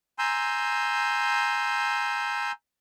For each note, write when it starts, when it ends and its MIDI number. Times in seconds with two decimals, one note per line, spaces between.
0.19 2.52 80
0.19 2.52 82
0.19 2.52 84
0.19 2.52 88
0.19 2.52 91